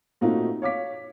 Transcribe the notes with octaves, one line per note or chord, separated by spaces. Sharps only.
A#2 A3 C4 D#4 F4 F#4
C#5 F5 D6 B6